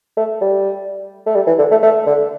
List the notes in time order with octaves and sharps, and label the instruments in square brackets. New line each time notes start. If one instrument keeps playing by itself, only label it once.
[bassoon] A3
G3
A3
G3
E3
D3
A3
A3
D3